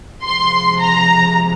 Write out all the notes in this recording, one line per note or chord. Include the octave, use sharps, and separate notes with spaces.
C3 F3 G#3 C6
A#5